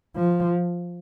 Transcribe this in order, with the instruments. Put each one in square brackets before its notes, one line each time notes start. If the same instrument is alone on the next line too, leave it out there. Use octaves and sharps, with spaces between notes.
[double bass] F3